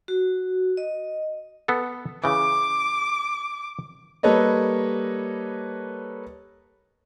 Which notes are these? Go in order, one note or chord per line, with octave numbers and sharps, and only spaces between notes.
F#4
D#5
B3 A4
C#3 E3 D6
G3 A#3 A4 B4 C#5 D#5